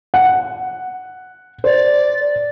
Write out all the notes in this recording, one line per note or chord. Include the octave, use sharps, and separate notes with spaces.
F#5
C5 D5